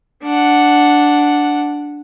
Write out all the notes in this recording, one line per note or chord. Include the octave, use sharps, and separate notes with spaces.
D4 F#5